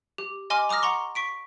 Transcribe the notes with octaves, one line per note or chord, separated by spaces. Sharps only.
G4
D#5 G#5 C6 D6 F6
A#5 D6 D#6 F6 A#6
F#5 A#5 C6 C#6
C#6 B6 D7